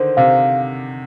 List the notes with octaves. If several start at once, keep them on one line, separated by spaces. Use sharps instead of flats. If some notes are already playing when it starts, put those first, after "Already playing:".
Already playing: D3 D#3 C5
C3 F5